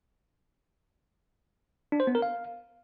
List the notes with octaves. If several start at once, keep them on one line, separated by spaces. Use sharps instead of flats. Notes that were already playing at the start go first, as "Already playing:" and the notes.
D4
C5
B3
A#4
F5